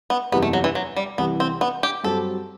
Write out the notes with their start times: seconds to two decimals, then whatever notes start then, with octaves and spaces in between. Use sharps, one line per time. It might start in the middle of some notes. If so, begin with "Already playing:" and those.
0.10 B3
0.32 F#1 E2 C3 E3 G3 B3
0.42 A3
0.53 F#3
0.64 E3
0.75 F#3
0.96 G3
1.18 C2 C3 E3 B3
1.40 C4
1.61 B3
1.83 G4
2.04 G2 F#3 C4 G4 A4